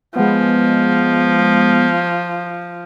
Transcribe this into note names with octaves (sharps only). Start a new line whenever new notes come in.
F3 G#3 B3